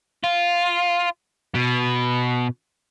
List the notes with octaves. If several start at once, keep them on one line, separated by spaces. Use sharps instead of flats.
F4
B2